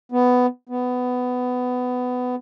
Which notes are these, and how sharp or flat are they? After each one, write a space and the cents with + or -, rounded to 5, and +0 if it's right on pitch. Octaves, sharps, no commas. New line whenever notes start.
B3 +10
B3 +15